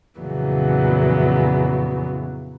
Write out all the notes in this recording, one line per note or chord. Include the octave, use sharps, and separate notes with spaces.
F2 A#2 C#3 E3 F#3 B3